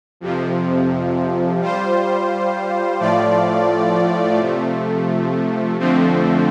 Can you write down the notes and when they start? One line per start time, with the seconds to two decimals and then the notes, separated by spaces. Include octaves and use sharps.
0.21 F2 C3 F3
1.60 G3 F4 C5
2.99 A2 F3 A3 F4 D5
4.39 C3 F3 A3
5.79 F2 D3 F3 A3 C4